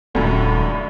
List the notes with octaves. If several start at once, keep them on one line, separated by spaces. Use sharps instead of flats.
D#1 C#2 F#2 A2 D3